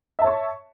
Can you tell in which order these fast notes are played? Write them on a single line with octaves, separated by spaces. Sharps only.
E5 A5 C#5 C#6